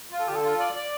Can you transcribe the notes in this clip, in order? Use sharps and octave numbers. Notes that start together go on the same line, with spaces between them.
F4
A4
D3 G4
A4
F4
D5
D5